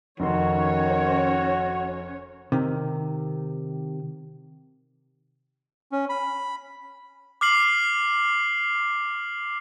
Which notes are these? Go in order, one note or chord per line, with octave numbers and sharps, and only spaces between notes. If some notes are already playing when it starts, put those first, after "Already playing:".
F1 D#3 C#4 F#4 C#5 C6
C3 D#3
C#4
B5
D6 F6 C7 F#7